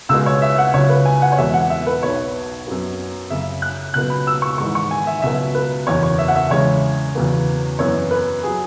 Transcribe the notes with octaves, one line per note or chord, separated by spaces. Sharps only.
C#2 B2 G#3 B3 E6
C#5
E5
F#5
C#2 C#3 F#3 C#5
B4
G#5
F#5
C#5
E2 B2 G#3 B3 E5
F#5
E5
B4
B1 B2 B3 C#5
F#2 F#3 B3
F#1 F#2 C#3 E5
F#6
C#2 B2 F#3 B3 F#6
B5
E6
C#6
G#1 G#2 E3 G#3 C#6
C#6
G#5
E5
C#2 B2 F#3 B3 E5
B4
F#1 E2 B2 C#5
C#5
E5
F#5
E5
E2 C#3 G#3 C#5
E2 C#3 F#3 B3
F#2 E3 B3 C#5
B4
F#3 G#4